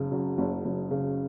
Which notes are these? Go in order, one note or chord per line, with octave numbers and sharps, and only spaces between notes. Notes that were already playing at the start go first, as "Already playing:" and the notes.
Already playing: F#1 C#3
F#2
F#1
F#1
C#3